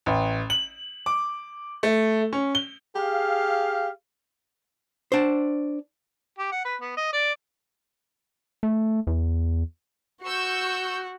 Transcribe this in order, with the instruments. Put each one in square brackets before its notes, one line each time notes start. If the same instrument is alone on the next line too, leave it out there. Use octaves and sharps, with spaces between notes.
[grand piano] A1
F#7
D6
A3
C#4
G7
[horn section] G4 G#4 F5
[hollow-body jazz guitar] D4 C5
[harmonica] G4
F#5
B4
B3
D#5
D5
[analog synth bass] A3
E2
[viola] F#4 [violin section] C#6 E6 G6